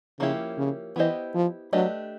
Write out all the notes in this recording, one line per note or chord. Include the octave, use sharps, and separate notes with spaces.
C#3 F3 A#3 C#4 E4 G4
C#3
E3 B3 E4 G4 C5 D#5
F3
F#3 A3 D4 G4 B4 D#5